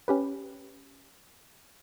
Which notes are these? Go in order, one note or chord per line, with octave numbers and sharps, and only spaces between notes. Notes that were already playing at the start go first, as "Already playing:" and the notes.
C#4 G4 B4